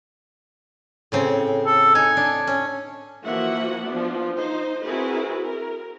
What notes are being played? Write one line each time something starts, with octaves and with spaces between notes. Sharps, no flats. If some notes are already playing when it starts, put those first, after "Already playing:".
A2 C#3 C4
A4
D#4 G#5
D4
C#4
E3 F3 A#3 F#4 E5 F#5
F3 B3 D4
D#4 C5
C4 E4 F#4 G#4 A#4 B4
A#4